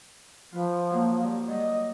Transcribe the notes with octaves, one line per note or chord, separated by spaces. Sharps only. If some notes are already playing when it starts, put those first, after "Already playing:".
F3 F4 B4
F#3 A#3
G2
F#3 G3 D#5